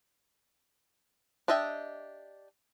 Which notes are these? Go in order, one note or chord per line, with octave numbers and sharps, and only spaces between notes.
D4 G4 D#5 E5 G5